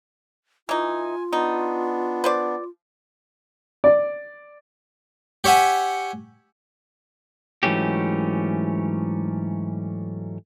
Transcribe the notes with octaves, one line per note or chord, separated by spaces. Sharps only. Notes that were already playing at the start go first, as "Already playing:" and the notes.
E3 D#4 F4 G#5
B3 D4 D#4
B4 C5 D5
D5
G4 C#5 E5 F#5 G#5
G#2 E3 F#3 A3 C#4 G4